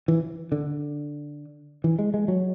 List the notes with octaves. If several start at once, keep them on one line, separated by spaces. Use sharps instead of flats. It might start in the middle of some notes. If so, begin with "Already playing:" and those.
E3
D3
E3
G#3
G#3
F#3